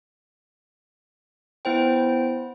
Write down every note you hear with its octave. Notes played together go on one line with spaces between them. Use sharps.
B3 E4 C5 G5